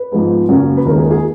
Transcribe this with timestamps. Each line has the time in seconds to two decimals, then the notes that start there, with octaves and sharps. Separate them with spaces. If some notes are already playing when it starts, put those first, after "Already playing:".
Already playing: B4
0.12 G#2 F3 G#3 B3
0.49 F#2 C#3 F#3 A#3 C#4
0.77 B4
0.86 D#2 D#3 G#3 A#4
0.98 G#4
1.04 A#4
1.10 G#4